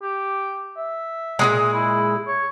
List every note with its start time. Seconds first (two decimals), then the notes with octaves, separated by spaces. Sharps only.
0.02 G4
0.77 E5
1.39 A#2 C#3 G#3
1.74 E4
2.27 C#5